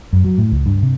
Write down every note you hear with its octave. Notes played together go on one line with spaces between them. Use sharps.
F#2
F#3
A2
C#2
G2
C3